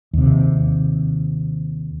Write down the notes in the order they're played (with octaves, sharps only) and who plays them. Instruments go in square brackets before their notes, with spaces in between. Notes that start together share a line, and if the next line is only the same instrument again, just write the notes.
[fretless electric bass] D#2 C3